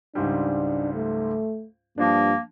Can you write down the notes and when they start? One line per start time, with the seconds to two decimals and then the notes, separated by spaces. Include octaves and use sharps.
0.15 C#2 G#2 G3 D4
0.94 A3
1.98 G2 F3 A#3 D4